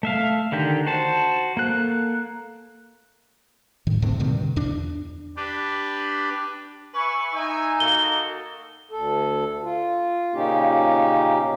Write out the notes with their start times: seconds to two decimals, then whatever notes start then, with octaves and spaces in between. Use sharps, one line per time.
0.03 A3 E5 F5
0.52 D3 D#3 G4
0.87 F#4 C5 A5
1.57 A#3 A4 F#6
3.87 A2 D#3
4.02 E2 A2 D3 C4
4.20 G2 B2 D3 D#3
4.56 E2 D4
5.36 D4 G4 B4
6.94 B4 E5 G#5 C#6
7.34 D#4 E5 G#5
7.80 A#3 F#4 A4 G7
8.91 D2 A4
9.63 F4
10.34 A#2 C#3 A#3 C#4 D#4 G4
11.41 B2